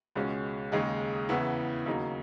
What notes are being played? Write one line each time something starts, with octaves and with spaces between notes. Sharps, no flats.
C#2 B2 G#3 C#4
D#2 C#3 G#3 D#4 G#4
E2 C#3 E3 B3 E4
D#2 C#3 F#3 A#3 D#4